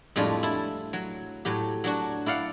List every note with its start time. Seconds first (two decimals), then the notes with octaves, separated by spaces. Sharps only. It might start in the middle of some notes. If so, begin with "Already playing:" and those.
0.16 F2 A2 G3 G#3 D4 F4
0.43 E4 A5
0.93 F#3
1.45 A2 F#3 G4
1.84 F#3 D4 F#4
2.26 E4 D5 F5 F#5